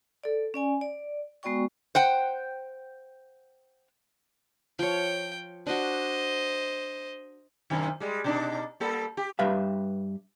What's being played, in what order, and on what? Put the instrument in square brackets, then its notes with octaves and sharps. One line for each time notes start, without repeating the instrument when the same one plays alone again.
[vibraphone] A4 D5
C#4 D5 G#5
D5
G#3 B3 F#4 D5 G5 C#6
[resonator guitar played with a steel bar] C5 F#5 G5
[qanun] F3 C#5 [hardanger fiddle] G5
[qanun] D4 F#4 [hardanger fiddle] C5 D#5
[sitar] F#2 C3 D#3
G3 G#3
B2 D4 D#4
G3 A#3 A4
G4
[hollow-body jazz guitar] G2 G4 B4 E5 F5